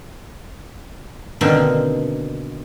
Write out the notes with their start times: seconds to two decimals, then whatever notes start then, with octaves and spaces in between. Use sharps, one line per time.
1.41 B2 D3 D#3 A#3 C4